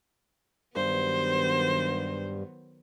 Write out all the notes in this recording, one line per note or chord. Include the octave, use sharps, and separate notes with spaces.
G2 D#3 F#3 B3 C5